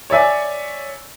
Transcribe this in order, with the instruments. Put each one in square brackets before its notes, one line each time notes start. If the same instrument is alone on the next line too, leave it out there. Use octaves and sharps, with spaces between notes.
[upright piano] C#5 D5 E5 G#5